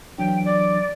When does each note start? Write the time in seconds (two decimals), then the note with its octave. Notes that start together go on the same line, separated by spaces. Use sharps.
0.18 E3 F#3 D4 G5
0.45 D5